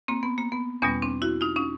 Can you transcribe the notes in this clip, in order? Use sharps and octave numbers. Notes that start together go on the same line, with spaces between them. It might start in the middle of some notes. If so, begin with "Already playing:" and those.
A#3 C4
B3
A#3
B3
E2 B2 G3 B3 C#4
C4 D4
E4 F#4
D#4 F4
C#4 D#4